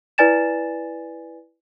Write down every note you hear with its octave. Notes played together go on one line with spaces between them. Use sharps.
E4 B4 D5 G#5 A6 E7